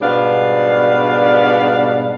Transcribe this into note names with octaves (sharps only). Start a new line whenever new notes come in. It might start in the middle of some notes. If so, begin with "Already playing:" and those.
G#2 B2 G3 B3 D4 F5